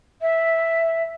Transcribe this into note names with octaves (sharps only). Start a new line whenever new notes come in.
E5